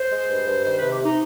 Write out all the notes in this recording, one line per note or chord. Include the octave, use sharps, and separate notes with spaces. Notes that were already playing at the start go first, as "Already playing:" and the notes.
Already playing: C5
G#3
G2
G2
D#3 C5
C3 B4
G4
C3 D#4